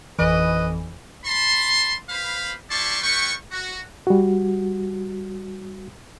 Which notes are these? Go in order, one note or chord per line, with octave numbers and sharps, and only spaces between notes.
G#1 F2 E3 B4 D#5
A5 B5 C6
B4 C5 F5 B5
G3 E4 D5 A5 C6 C#6
G3 E4 B4 G5 C#6
F#4
G3 F#4